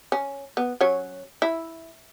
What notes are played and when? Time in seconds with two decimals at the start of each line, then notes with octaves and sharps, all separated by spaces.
0.12 C#4
0.57 B3
0.81 F#3 C#4 C#5
1.42 E4